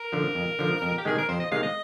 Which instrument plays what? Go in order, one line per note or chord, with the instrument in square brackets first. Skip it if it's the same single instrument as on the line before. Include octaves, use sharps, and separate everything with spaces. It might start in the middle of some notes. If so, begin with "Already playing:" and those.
Already playing: [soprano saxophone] A#4
[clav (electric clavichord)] D3 F3
F2
D3 F3
F2
[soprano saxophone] G4
[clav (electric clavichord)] C3 D#3 G#3 [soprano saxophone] G#4
[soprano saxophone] A#4
[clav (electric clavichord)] F2 [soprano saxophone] C5
[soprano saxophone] D#5
[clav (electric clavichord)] C3 D#3 G#3 [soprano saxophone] F5
[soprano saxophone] D#5